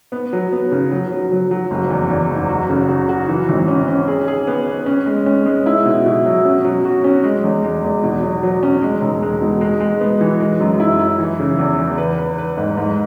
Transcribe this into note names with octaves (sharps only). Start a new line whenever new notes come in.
B3
F#3
B3
C#3
F#3
F#3
F#3
F#3
F#1
E2
E2
F#1
F#4
C#3
F#4
F#4
E3
G#1
C#4
C#4
G#4
G#4
B3
B3
C#4
G#3
C#4
G#3
E4
B2
B2
F#3
C#4
F#3
F#4
C#4
G#3
E2
G#3
E2
B2
F#3
F#3
C#4
G#3
E1
G#3
B2
G#3
G#3
B3
E3
G#3
F#2
E4
E4
E3
C#3
E2
E2
B4
B4
B4
G#2
G#2